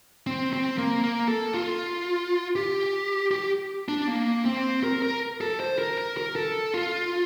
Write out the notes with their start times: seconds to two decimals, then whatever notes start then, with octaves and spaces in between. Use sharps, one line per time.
0.27 C4
0.53 C4
0.78 A#3
1.03 A#3
1.28 A4
1.54 F4
2.56 G4
3.31 G4
3.88 D4
4.08 A#3
4.45 C4
4.84 A#4
5.02 A#4
5.41 A4
5.60 C5
5.79 A#4
5.98 A#4
6.17 A#4
6.36 A4
6.74 F4